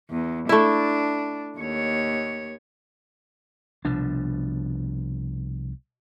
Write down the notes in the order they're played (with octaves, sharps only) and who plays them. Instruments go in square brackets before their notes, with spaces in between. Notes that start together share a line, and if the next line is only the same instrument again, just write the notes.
[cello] E2
[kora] A3 E4 [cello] D4
[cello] D#2 C#5
[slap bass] C2 B2 F3 D4